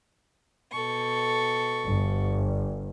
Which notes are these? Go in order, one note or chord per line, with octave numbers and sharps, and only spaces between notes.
B2 A4 C#6
G1